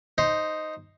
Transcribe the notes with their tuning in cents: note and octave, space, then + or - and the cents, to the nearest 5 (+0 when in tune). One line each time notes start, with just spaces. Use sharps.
D#4 +0 C5 +0